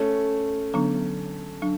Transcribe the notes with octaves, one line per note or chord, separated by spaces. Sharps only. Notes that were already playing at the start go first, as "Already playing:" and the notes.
Already playing: A3 C#4
D3 F#3 B3 D4
F#3 D4